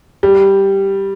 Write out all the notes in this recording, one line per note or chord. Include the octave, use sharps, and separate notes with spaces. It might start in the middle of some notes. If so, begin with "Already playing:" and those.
G3